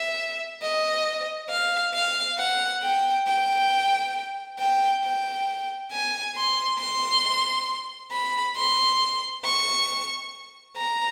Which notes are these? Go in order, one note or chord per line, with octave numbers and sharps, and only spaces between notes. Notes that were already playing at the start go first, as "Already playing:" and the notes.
Already playing: E5
D#5
F5
F5
F#5
G5
G5
G5
G5
G#5
C6
C6
B5
C6
C#6
A#5